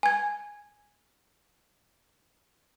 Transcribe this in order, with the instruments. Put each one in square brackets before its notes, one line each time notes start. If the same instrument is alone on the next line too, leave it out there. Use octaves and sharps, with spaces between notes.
[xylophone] G#5 G#6